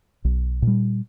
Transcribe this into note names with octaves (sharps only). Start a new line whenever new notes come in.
B1
A#2
G3